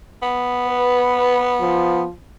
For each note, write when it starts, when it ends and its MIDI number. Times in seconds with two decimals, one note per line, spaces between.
0.22 2.03 59
0.68 1.54 71
1.60 2.11 53